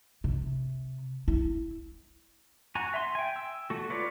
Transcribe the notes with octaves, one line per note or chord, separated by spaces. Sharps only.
C3
E4
F#4 G#5 A#5
E5 C6
G5 G#5
E6
A3 F#4
F4 B4 C#5 D5